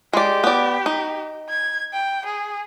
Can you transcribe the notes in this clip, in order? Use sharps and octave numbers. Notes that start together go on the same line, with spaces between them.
G#3 G4 D5
B3 D5
D#4
G#6
G5
G#4